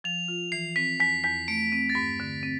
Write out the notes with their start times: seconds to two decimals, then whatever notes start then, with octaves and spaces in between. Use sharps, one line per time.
0.04 F3 F7
0.28 F4
0.52 E3 C7
0.76 C4 B6
1.00 E2 B6
1.24 E2 B6
1.48 A3 D7
1.72 C4
1.90 A6
1.95 G2 B6
2.20 D3
2.43 C4